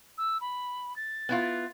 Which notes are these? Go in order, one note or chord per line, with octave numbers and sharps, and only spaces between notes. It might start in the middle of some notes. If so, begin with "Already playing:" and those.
E6
B5
A6
B3 E4 F4